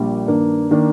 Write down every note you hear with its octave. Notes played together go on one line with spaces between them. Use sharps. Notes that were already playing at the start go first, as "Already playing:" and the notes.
Already playing: A#1 A#2 G3
G2 D#3 A#3 D4
D#3 A#3 D4